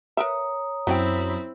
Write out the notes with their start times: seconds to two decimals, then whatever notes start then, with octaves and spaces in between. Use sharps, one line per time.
0.17 A#4 B4 C#5 E5 A#5 D#6
0.87 F#2 F#3 C4 C#4 E4 G5 B5 B6